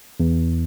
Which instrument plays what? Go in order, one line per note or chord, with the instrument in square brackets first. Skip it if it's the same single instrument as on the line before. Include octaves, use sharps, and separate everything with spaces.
[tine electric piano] E2